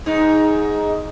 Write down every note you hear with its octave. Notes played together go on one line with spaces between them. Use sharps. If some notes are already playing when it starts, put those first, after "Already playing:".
G#2 D#4